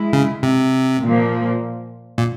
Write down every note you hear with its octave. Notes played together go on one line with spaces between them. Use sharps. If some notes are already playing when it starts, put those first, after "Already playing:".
Already playing: G#3 E4
C#3
C3
A#2 F3 A#3
A#2